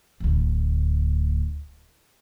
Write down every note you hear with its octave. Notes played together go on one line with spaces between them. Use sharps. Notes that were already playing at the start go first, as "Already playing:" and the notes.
D1 D2